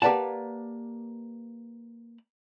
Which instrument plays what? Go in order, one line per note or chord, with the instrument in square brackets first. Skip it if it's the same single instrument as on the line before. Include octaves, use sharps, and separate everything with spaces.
[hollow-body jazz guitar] A#3 G4 B4 D5 F#5 A5